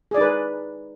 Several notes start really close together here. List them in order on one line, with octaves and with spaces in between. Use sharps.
G#4 D5 D#4 B4